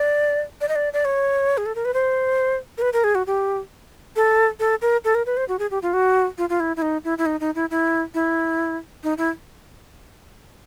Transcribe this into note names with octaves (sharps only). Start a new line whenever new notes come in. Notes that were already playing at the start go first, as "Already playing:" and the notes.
Already playing: D5
D5
D#5
D5
D5
C#5
G#4
A4
A#4
B4
C5
A#4
B4
A#4
G#4
F#4
G4
A4
A4
A#4
A4
A#4
B4
C5
F#4
G#4
G4
F4
F#4
F4
F4
E4
E4
D#4
E4
E4
D#4
D#4
E4
E4
E4
D#4
E4